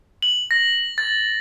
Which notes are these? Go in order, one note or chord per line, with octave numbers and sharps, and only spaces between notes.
F#7
A#6
A6